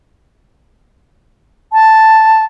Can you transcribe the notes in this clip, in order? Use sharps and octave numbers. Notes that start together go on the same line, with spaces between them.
A5